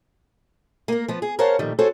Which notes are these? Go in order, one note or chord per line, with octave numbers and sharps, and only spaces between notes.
A#3 A#4
F3 B3
G#4
A#4 C5 C#5 F5 F#5 A5
A#2 D#3 F3 G3 A3
F#4 G#4 A4 C5 C#5